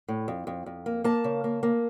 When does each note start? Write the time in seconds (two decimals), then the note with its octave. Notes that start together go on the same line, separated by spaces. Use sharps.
0.08 A2
0.28 F2
0.47 F2
0.66 F2
0.86 A#3
1.04 A#3 A5
1.24 C#3
1.44 A#3
1.63 A#3